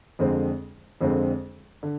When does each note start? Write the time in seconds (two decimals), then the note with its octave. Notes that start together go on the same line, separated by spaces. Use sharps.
0.19 F2 D3 G#3 C4
1.01 F2 D3 G#3 C4
1.83 D3